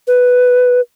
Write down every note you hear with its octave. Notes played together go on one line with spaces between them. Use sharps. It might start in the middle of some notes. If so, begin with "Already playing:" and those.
B4